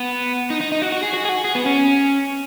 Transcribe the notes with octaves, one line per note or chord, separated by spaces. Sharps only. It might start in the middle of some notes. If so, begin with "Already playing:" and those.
Already playing: B3
D#4
D#4
D#4
F#4
F#4
G#4
F#4
G#4
F#4
G#4
B3
C#4